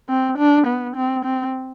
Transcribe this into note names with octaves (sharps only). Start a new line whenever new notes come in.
C4
D4
B3
C4
C4